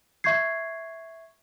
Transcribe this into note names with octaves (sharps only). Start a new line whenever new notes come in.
E5 C#6 G6 G#6 C7